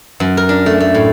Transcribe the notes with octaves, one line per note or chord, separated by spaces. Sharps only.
F#2
A#4
D4
A3
A3
A2